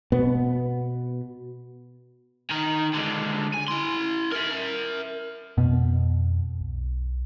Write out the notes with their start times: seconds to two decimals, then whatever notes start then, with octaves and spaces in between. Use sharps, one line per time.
0.12 B2 B3
2.51 D#3 A#4
2.94 D3 G#3
3.54 G#5
3.68 E4 C6
4.33 A#4 E5
5.58 F2 B2
6.61 B1